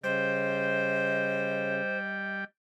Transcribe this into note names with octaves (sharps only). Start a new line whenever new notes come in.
C#3 G3 C5 D#5 G5